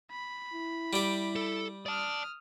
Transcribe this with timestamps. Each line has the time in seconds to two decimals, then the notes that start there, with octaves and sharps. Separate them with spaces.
0.11 B5
0.54 E4
0.93 G3 G4
1.36 A4
1.86 D5 A5 D#6 F6